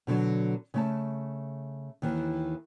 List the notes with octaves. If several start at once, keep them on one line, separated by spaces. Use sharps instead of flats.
B2 D3 D#3 F#3
C#3 A3 A5
D#2 D#3 E3